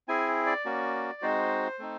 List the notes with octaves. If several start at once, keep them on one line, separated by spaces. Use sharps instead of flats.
C4 E4 G#4 G#5
D5
A#3 C#4 F#4
G#3 C4 D#4 F#4 C5
A3 C4 D#4